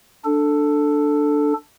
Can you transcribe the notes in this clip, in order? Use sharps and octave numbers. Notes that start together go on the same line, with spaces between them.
D4 A4